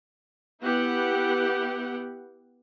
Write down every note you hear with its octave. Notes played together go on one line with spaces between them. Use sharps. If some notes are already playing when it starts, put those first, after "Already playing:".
B3 E4 G4 F#5